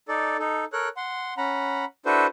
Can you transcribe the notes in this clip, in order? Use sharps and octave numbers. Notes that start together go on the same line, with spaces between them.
D#4 A4 D5
D#4 A4
A4 A#4 C#5 F#6
F#5 C6
C#4 F#5 A#5 B5
D4 E4 F#4 A4 B4 C5